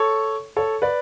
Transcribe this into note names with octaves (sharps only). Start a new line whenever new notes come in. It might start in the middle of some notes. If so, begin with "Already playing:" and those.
Already playing: A4 C#5
A4 C#5
B4 D5